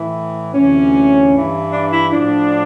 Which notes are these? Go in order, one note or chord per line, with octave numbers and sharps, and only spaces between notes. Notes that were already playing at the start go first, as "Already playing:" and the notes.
Already playing: A2 E3
D2 C3 E3 C#4
G2 E3
D4
E4
A2 F3 D4